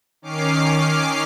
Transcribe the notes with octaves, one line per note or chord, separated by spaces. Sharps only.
D#3 C#4 D6 F6 C7